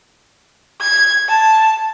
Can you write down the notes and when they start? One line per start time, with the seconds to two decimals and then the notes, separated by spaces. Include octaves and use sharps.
0.81 G#6
1.29 A5